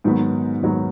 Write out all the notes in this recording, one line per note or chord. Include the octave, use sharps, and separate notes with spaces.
G#2 D#3 F#3 B3
G#2 D#3 F#3 B3